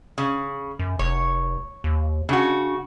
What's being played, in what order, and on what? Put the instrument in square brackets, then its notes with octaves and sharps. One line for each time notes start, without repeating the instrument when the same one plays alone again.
[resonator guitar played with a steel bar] C#3
[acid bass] F#2
[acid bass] F1 [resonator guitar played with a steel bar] C#5
[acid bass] D#2
[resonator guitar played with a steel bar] C#3 F#4 [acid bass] D4